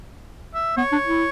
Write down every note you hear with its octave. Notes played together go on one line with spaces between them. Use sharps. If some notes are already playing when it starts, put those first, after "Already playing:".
E5
B3 C#5
D4
E4